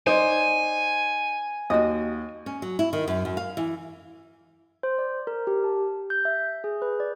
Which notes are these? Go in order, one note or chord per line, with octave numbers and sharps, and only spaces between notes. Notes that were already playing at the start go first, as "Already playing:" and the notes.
D#4 C5 D5 G#5
D#2 F#4 D#5
C#4
F#3
E4
D#3
F#2
F#2
F5
E3
C5
D5
A#4
G4
A5
G6
E5
G#4
B4
D5